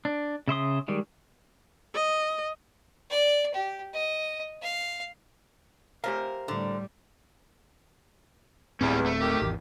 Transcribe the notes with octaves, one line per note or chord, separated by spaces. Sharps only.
D4
C#3 E5 C6 D#6
D#3 G3 G#3
D#5
D5
G4
D#5
F5
G4 A#4 C5 F5
A2 D3 G3 D4
D1 E2 A2 G3 C4 C#4
A3
D#3 G4
G#1 E2